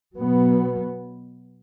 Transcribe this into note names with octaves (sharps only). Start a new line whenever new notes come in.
B2 F#3 B3